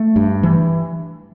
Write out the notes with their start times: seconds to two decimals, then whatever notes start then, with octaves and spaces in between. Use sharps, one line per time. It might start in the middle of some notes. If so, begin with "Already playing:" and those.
Already playing: A3
0.16 G2
0.43 E3